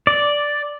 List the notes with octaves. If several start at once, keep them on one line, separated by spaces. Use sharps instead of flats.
D5